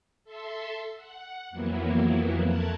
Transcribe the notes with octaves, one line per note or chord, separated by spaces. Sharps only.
A4 E5 C6
F#5
F2 E3 F#3 A#3 B3 E4
F2 A3 A#4 A5 F#6 G#6